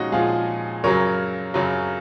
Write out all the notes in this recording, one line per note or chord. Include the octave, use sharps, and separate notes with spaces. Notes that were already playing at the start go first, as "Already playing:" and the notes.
Already playing: A#2 F3 G#3 C#4 D#4 F4 F#4
A#2 F3 G#3 F4 G#4
F#2 C#3 F#3 A#4 C#5
F#2 C#3 F#3